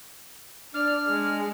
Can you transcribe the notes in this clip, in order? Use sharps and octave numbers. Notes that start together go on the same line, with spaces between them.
D4 D5 F6
G#3